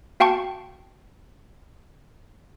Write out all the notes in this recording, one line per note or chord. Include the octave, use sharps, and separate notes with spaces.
F#4 F5 G5 A5 C#6